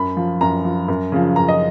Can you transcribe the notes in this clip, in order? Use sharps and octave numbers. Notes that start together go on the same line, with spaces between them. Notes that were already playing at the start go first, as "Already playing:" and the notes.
Already playing: F#2 B5
F3
F#2 A#5
F3
F#2
C#3 F3
F#2 A#5
D#5